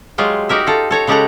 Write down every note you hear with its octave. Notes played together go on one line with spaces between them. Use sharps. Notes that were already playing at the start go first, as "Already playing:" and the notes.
F#3 G#3 F4 G4
D#4 F#4 G4 A#4 E5
F4 A4 A#5
A4 C#5 A#5
C#3 G#3 G4 A4 F#5 A#5